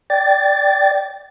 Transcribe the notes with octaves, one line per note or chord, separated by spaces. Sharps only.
D5 G5 A6